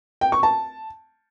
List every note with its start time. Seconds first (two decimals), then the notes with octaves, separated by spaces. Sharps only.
0.21 G5
0.32 C#6
0.43 A5